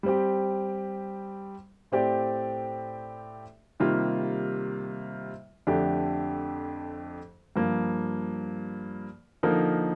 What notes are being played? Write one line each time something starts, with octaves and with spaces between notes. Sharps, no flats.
G3 C4 G4
A2 A3 C4 G4 D5
C3 D#3 G3 A#3 F4
F2 D3 A3 D4 G4
G2 F3 A#3
D3 F3 A#3 D#4 A#4